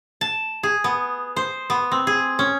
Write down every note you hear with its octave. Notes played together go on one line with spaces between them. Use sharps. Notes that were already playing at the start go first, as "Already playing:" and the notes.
A5
G#4
B3
C5
B3
C4
G#4
C#4